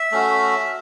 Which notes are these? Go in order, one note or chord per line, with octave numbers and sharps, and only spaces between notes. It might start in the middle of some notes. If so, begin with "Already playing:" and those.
Already playing: E5
A3 C#4 F#4